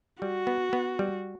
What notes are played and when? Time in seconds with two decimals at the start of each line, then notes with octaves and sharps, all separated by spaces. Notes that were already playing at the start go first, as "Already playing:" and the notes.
0.22 G3 F#4
0.47 B3
0.73 B3
0.99 G3